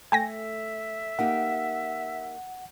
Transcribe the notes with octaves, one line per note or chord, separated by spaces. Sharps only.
A3 E5 G5 G#5 A#6
A#3 D#4 G4 F#5